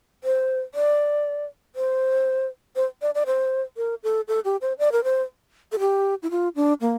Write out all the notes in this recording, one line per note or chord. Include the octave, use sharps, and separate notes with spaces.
C5
D5
C5
C5
D5
D5
C5
A#4
A4
A4
G4
C5
D5
A#4
C5
A4
G4
E4
F4
D4
A#3